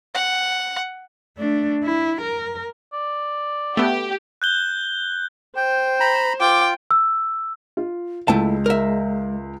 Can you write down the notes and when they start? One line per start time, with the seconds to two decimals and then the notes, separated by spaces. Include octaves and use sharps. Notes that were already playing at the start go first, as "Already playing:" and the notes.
0.15 F#5
1.37 A3 D4
1.83 E4
2.21 A#4
2.93 D5
3.77 A3 B3 G4
4.42 F#6 G6 G7
5.57 C5 G5
6.00 A#5 B5
6.40 F4 G5 D6
6.91 E6
7.77 F4
8.28 C#2 G#3 A3 E4 G5 A5
8.66 A#4 E5